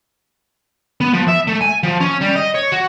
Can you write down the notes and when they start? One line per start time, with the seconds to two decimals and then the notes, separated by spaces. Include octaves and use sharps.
1.01 B3
1.13 F3
1.28 E5
1.47 A3
1.61 G#5
1.83 F3
2.01 C#4
2.22 G3
2.36 D#5
2.55 C#5
2.72 F#4